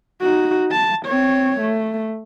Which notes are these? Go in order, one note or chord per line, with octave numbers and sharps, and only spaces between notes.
D#4 F#4
A5
C4 C#5
A3